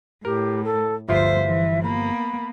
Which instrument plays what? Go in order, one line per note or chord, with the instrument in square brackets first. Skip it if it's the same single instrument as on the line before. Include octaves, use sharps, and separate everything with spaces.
[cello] A2 [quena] G4 [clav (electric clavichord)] A#4
[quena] A4
[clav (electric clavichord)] G1 F3 F4 [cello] D2 C5 [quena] E5
[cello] E3
[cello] A#3 B3 [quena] B5